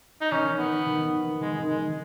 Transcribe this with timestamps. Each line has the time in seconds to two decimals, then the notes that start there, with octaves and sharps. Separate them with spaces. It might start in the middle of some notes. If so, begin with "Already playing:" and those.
0.21 D#4
0.32 D#3 C#4
0.50 D#3
0.59 B3
0.68 D#4
0.86 D#3
1.05 D#3
1.23 D#3
1.41 D#3 G#3
1.60 D#3
1.69 G#3
1.77 D#3